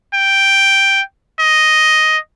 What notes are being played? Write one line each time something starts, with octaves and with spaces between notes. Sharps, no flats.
G5
D#5